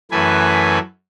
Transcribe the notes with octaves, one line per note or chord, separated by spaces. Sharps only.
F#2 E3 A3 B4 G#5